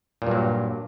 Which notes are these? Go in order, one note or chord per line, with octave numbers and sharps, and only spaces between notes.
G2 A#2 F#3